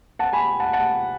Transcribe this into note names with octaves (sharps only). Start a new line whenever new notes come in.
F#5 A5
G#5 B5
F#5 A5
F#5 A5